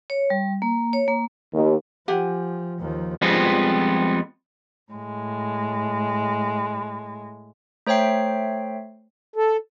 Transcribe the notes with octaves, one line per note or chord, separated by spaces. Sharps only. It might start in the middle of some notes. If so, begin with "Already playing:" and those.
C#5
G3
A#3
C#5
A#3
D#2
F3 G4 F#5 G#5
D#2 F3
F2 F3 G3 G#3 B3 C4
A2 G#3
A3 C5 C#5 E5 G5 C7
A4